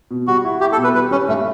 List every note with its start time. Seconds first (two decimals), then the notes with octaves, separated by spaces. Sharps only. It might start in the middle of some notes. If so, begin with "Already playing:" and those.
0.11 B2
0.27 G3 F#4
0.44 E4
0.61 E4 G4
0.72 A4
0.77 B2
0.84 B4
0.94 G3 B4
1.11 G3 C#4
1.28 G2 A3